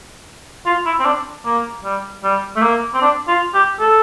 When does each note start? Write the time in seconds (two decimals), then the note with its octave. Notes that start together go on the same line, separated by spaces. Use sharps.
0.66 F4
0.86 E4
0.99 C4
1.06 D4
1.45 A#3
1.84 G3
2.23 G3
2.56 A3
2.62 A#3
2.94 C4
3.02 D4
3.28 F4
3.54 G4
3.80 A4